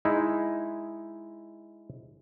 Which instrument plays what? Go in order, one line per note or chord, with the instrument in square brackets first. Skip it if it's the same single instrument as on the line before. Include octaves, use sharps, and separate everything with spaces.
[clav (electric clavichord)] G#3 D#4 E4